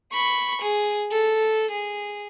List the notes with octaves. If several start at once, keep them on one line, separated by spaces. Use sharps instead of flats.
B5 C#6
G#4
A4
G#4